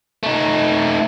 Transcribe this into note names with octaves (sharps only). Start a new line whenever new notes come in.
A3 D#4